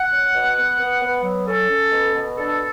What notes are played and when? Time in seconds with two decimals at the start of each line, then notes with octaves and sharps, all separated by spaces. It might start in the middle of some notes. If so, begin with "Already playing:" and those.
Already playing: F#5
0.11 C#4
0.33 B2
0.56 B3
0.79 B3
1.01 B3
1.24 F#3
1.46 C#4 A4
1.69 C#4
1.91 B2
2.14 B2
2.36 D4 A4